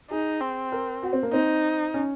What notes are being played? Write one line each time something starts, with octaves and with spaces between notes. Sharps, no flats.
D#4 G#4
C4
A#4
F#4
C4
A#3
C4 D#4
C#4